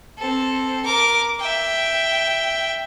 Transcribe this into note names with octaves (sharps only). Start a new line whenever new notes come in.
C4 A4
A#4 D6
E5 G5